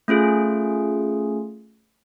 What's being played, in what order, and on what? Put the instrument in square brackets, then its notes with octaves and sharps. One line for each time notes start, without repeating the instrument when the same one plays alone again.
[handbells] A3 C#4 F4 G#4